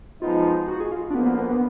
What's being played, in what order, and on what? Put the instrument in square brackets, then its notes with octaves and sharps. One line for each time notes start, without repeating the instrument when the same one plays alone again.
[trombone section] F3 G#3 B3 D#4 [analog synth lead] F4
[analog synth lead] F#4
G#4
F4
D4
[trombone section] D2 D3 F3 A#3 [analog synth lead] B3
[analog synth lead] B3
B3
B3